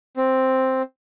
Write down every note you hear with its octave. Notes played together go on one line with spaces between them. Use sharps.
C4